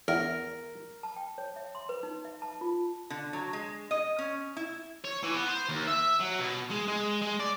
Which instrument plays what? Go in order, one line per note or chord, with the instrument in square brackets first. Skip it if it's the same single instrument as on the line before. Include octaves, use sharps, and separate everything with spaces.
[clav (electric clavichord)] E2 [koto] A#4
[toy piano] A5
G5
C#5
E5
C6
B4
D#4
E5
A5
F4
[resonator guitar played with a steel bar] D3
F#3
G#3
D#5
C#4
E4
[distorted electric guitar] C#5
E3
B3
C5
D#2
E5
F#3
B2
G#3
G#3
G#3
D5